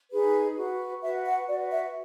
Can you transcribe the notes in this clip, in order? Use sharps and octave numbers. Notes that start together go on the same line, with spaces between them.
D#4 G#4 B4
F#4 B4
F#4 B4 E5
F#5
F#4 B4 D5
E5